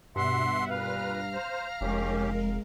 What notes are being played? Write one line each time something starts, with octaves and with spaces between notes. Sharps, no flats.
G2 B2 E5 F#5 C6
A#2 B4 F5 A#5 F6
C5
F1 D#3 G#3 C#4 G4 A#4